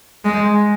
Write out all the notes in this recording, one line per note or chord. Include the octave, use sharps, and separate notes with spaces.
G#3